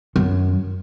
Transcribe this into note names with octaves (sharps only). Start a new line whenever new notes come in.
F#2